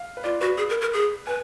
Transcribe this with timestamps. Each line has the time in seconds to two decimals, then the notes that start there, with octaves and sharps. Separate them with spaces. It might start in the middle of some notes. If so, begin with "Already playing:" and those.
Already playing: F5
0.17 B4
0.24 F4 D5
0.41 F#4 B4
0.58 G#4
0.69 A#4
0.81 A#4
0.93 G#4
1.27 B4 G#5